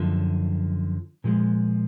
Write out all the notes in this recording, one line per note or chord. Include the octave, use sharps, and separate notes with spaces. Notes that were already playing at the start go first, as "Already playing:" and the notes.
Already playing: F#2 D3 F3
A#2 F3 G#3